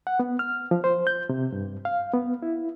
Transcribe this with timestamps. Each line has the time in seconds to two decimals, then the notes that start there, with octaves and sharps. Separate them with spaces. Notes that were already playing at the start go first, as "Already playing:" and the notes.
0.07 F#5
0.20 B3
0.39 F6
0.71 F3
0.84 C5
1.07 G6
1.29 C3
1.52 G2
1.85 F5
2.13 B3
2.42 E4